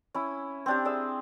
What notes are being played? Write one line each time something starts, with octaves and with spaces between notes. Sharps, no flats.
C#4 E4
C4 D4 G4
G#4 D5 E5